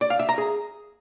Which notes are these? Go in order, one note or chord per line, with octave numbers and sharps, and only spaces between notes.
D5
F5
E5
A#5
G#4